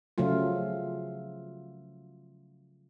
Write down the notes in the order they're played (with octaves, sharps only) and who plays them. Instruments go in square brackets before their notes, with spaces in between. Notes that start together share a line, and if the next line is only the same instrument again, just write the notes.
[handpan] C#3 F3 F#3 A3 F4